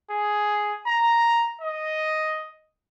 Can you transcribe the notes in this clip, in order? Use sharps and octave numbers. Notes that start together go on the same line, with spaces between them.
G#4
A#5
D#5